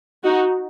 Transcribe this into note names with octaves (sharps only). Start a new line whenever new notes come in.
D#4 F#4